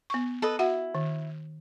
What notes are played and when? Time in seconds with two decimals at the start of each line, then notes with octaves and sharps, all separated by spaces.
0.10 B3 C#6
0.42 A4 B4 D#5
0.59 E4 F#4 F#5
0.95 D#3